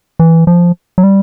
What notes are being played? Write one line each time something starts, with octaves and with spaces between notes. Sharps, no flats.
E3
F3
F#3
G3